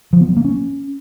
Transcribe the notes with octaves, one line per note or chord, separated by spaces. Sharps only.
F3
B3
F#3
A#3
C#4